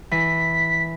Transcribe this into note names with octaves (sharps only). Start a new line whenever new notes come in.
E3 B6